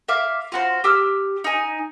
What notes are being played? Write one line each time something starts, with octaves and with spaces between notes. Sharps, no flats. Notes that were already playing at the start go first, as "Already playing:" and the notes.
E5 F5 D6
F4 F#4 C5
G4 E6 F6
D#4 G#5